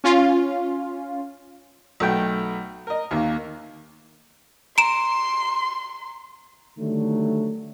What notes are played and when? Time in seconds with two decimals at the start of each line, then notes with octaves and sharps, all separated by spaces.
0.04 C#4 F4
2.00 B1 A3 G5
2.87 A#4 D#5
3.11 D#2 D#3 A#3
4.78 A#5 C6 D7 E7
6.78 D3 D#3 F#3 G3 A3